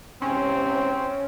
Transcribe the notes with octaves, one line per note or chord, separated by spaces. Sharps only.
E2 G#2 C3 C4 C#4